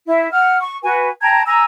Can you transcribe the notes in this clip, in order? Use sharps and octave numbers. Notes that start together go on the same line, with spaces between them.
E4 E5
F#5 F6
C#6
F#4 B4 G#5
G5 A5 A#5 G#6
G#5 A#5 E6